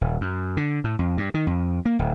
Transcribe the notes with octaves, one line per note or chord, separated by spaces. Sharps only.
D#1
F#2
D3
A2
F2
G2
D#3
F2
A#3
D1